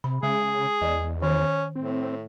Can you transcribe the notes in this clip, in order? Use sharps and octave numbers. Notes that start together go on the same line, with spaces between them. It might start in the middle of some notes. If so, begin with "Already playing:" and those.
C3 B5
C#3 G#3 G#4
E2 D5 D#5
D#3 C#4
A2 C4